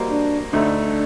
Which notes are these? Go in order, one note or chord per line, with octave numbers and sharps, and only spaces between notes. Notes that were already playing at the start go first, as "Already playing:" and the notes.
Already playing: G3 A#3 F#4 C5 D#5
D4
D2 D3 A3 D4 D#4